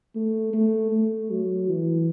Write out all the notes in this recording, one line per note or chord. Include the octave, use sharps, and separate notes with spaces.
A3
A3
A3
F#3
E3